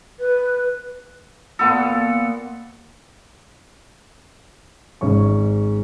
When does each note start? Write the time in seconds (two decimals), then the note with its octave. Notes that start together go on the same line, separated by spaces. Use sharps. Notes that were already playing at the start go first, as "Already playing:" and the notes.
0.20 B4
1.59 A#2 B3 A4
5.01 G#1 G#2 C#4 C#6